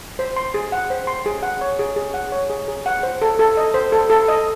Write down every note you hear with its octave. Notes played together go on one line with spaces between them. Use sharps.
C5
C6
G#4
F#5
C5
C6
G#4
F#5
C#5
G#4
G#4
F#5
C#5
G#4
G#4
F#5
C5
A4
A4
D#5
C5
A4
A4
D#5